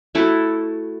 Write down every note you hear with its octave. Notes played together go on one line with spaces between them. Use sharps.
A3 E4 F#4 A4